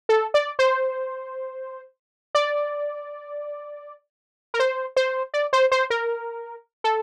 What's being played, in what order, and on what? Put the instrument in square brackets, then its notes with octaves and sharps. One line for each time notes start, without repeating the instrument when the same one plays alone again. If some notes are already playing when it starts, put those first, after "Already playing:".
[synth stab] A4
D5
C5
D5
A#4
C5
C5
D5
C5
C5
A#4
A4